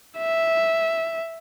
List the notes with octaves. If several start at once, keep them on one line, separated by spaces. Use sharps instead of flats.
E5